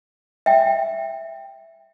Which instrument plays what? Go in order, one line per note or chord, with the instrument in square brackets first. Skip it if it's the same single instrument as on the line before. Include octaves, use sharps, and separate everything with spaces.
[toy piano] E5 G5